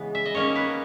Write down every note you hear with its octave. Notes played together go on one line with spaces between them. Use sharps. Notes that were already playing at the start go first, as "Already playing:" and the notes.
Already playing: C#3 E3 G#3 B3
E5
D#5
D#3 A#3 C#4 C#5
B4